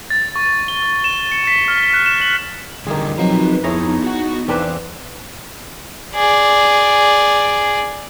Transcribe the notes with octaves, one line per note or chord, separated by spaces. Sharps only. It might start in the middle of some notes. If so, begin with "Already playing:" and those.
A6
C#6
G7
E7
C#7
B6
F6
F#6
E7
F#7
E2 D3 D#3 G3 G#4
F3 F#3 C4 D#4 B4 A#5
F2 B3 D#4 E4 G#4 C#5 A#5
F#4 F#5
E2 C4 D4 B4 F5 D6 E6
G#4 D5